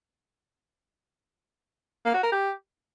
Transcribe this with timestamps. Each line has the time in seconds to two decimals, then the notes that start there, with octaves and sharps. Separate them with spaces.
2.05 A#3
2.14 F#4
2.23 A#4
2.32 G4